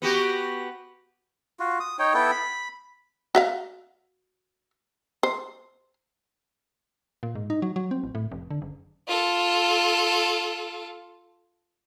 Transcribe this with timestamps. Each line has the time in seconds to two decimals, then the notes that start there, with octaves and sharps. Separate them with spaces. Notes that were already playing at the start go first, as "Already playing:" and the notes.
0.02 B3 F#4 G4
1.60 F4 F#4
1.80 D#6
1.99 D#4 C#5 G5
2.14 B3 E4 A4 G5
2.31 B5
3.35 F#4 E5 F5
5.23 C5
7.23 A#2
7.35 G#2
7.50 D#4
7.62 F#3
7.76 F#3
7.91 C4
8.04 A1
8.15 A2
8.32 F1
8.51 D3
8.62 F#1
9.08 F4 A4